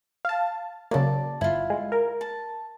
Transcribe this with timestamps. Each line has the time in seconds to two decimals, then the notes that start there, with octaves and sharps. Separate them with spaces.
0.25 F5 A5
0.91 C#3 F#3 A#3 D5 A5
1.41 G1 E4 F4
1.70 G#3
1.92 A#4
2.21 A5